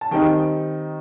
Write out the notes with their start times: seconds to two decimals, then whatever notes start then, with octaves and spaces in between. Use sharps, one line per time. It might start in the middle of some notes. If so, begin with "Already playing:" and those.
0.01 A5
0.11 D#3 G3 C4 D#4 G5